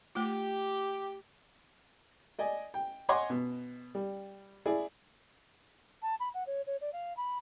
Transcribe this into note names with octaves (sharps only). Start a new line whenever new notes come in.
A3 F4 G4
D5 D#5 G#5
G5
C#5 D#5 F#5 G#5 C6 D6
B2
G3
E4 G#4 D5
A5
B5
F#5
C#5
C#5
D5
F5
B5